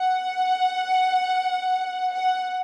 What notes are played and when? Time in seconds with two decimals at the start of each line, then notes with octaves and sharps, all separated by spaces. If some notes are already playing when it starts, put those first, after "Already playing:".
Already playing: F#5
2.12 F#5